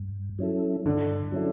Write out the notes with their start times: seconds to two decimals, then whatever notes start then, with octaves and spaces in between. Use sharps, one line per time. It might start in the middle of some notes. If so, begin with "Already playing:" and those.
Already playing: G2
0.39 F#3 C#4 E4 A4
0.85 G2 D3
1.32 F#3 C#4 E4 A4